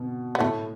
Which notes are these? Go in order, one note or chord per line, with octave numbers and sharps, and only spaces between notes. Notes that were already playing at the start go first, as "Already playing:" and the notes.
Already playing: B2
B3
A2 A3